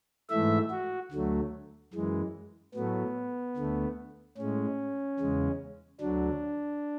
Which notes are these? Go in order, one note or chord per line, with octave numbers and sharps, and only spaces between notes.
G#2 E3 A3 E5
F#4
D2 D3 F#3 A3
F#2 E3 G#3
A2 F#3 A3 B3
D2 D3 A3
A2 G#3 C#4
E2 C#3 G#3
D2 D3 F#3 D4